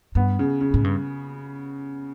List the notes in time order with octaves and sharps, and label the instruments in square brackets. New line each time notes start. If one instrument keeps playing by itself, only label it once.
[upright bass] G2 [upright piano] B3
[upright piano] C#3
C#3
[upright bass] A2
G2